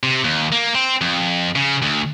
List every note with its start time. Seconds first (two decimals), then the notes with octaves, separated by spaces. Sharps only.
0.03 C3
0.24 D#2
0.52 A#3
0.74 C4
1.01 F2
1.56 C#3
1.82 D2